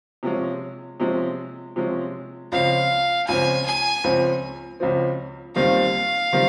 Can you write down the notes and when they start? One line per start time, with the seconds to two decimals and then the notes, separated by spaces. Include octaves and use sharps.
0.23 C3 F3 G#3 C#4
1.00 C3 F3 G#3 C#4
1.76 C3 F3 G#3 C#4
2.52 C#2 C#3 F3 C4 F5
3.28 C#2 C#3 F3 C4 G#5
3.66 G#5
4.04 C#2 C#3 F3 C4
4.80 C#2 C#3 F3 C4
5.56 D#2 D#3 G3 C4 F4 F5
6.32 D#3 G3 C4 F4